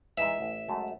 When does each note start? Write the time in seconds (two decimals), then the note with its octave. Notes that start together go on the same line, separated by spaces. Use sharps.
0.18 E3 G#3 D#4 E5
0.40 A1
0.68 F#2 G#3 A3